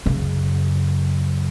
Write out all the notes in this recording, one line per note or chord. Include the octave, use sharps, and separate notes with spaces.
F#2 C#3